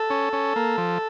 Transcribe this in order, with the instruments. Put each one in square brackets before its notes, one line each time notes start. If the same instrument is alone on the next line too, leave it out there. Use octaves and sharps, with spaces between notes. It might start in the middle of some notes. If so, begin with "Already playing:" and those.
Already playing: [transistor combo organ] A4
C#4
C#4
A#3
F3